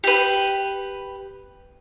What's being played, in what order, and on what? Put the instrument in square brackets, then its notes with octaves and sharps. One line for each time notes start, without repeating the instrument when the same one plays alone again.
[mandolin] G4 B4